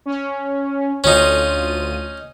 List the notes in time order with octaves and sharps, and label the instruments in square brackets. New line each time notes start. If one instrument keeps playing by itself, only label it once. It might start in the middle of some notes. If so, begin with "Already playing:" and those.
[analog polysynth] C#4
[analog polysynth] D2 F4 D#7 [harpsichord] C#4 D#4